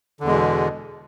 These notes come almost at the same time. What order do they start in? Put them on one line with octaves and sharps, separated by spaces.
D3 E2 G#3 B2